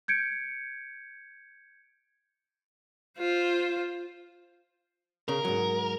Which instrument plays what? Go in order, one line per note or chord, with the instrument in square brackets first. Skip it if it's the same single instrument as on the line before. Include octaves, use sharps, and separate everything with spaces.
[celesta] G6 G#6 C#7 D7
[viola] F4 C5
[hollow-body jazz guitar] C#3 [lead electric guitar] A#4
[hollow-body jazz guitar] G#2 F#3